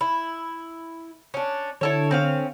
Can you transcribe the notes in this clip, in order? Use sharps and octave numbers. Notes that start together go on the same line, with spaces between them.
E4
C#4 D4
D3 E4 A4 C#5
C4 C#4 F5